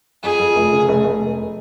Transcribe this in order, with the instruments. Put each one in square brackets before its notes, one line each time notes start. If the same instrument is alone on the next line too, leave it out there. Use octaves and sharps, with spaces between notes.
[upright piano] F2 [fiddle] G#4
[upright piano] F2
F1
C#3
F1
F1
F1